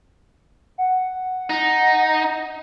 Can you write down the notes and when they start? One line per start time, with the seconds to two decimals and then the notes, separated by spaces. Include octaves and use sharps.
0.78 F#5
1.50 D#4